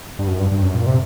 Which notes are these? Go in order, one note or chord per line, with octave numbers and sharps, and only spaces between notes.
G2
F#2
G2
G2
F#2
A#2
C3